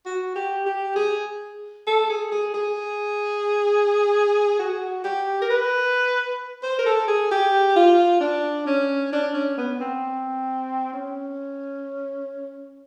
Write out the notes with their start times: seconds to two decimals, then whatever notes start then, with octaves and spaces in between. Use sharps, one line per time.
0.06 F#4
0.35 G4
0.66 G4
0.96 G#4
1.87 A4
2.10 G#4
2.31 G#4
2.54 G#4
4.59 F#4
5.04 G4
5.41 A#4
5.50 B4
6.63 C5
6.78 A#4
6.86 A4
7.08 G#4
7.31 G4
7.76 F4
8.20 D4
8.66 C#4
9.12 D4
9.34 C#4
9.57 B3
9.80 C4
10.93 C#4